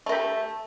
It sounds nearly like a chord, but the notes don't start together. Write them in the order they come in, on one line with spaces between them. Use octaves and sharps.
A3 A#4 G4 A4